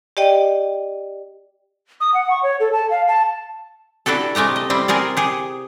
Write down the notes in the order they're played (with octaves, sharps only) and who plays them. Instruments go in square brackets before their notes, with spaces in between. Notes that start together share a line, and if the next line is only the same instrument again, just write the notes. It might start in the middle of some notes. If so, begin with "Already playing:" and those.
[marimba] G4 D5 D#5 G5
[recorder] D#6
F#5
C#6
C#5
A4
A5
F5
A5
[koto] D4 E4 F#4 G4 A4
C3 G#3 A3 G4 A#5
D#5
G3 C4 E4
C4 G#4 A#4 D5
G4 G#4